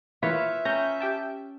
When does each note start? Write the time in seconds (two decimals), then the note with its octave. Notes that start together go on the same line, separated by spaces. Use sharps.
0.23 E3 A#3 F4 B4 C#5 E5
0.65 C#4 A#5 G6 A#6
1.00 G4 G5 A5